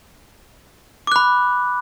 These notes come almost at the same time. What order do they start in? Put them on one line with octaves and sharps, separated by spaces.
D6 F#6 B5